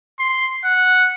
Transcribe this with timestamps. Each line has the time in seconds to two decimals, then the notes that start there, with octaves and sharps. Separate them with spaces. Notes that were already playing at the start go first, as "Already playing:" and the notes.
0.20 C6
0.64 F#5